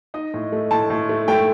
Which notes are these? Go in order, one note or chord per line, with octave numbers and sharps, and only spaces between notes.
D#4 D#5
A2
A3
A2 A5
A2
A3
A3 G5